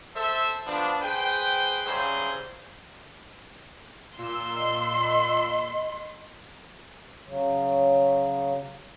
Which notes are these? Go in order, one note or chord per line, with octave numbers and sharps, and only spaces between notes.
A4 C5 E5
F3 G3 B3 D4
G#4 B4 C5 G5
C#3 E3 F#3 G3 G#4 C5
A#2 C6 E6
D#5
C#3 F#3